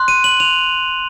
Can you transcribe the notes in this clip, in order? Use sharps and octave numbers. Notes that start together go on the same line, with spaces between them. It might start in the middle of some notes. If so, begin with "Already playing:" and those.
Already playing: C6 F#6
D#7
F#7
F7